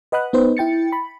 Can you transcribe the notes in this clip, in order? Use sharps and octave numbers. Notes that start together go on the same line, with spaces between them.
B4 D#5 F#5 B5 D#6 F#6
B3 D#4 B4 C5
E4 G5 A6 C#7
B5